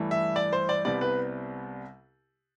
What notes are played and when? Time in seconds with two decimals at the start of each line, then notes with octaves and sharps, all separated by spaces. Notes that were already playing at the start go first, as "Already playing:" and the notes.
Already playing: G2 E3 A3
0.11 E5
0.36 D5
0.53 C5
0.69 D5
0.85 C2 C3 G3 B3 D5
1.01 B4